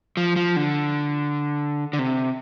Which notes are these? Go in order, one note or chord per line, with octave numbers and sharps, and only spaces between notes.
F3
F3
D3
D3
C3